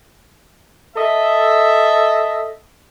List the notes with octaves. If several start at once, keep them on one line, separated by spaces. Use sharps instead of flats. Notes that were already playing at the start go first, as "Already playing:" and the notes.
A4 D#5 E5